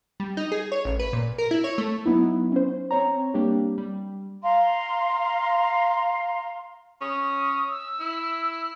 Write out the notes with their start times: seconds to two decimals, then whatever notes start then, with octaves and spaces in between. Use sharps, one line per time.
0.20 G3
0.37 D#4
0.52 G#4
0.72 C#5
0.85 A1
1.00 B4
1.13 A#2
1.38 A#4
1.51 E4
1.64 C#5
1.78 A3
2.06 F#3 B3 D#4 E4
2.52 C#4 C5
2.91 C4 C#5 A#5
3.34 G3 A#3 D4 G4
3.78 G3
4.43 F5 A#5 C6
7.01 C#4 D#6
7.71 E6
8.00 E4